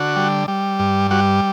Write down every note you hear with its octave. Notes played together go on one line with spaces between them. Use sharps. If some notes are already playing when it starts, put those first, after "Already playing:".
Already playing: D3 F#4
G3
G3
G2
G3 F#4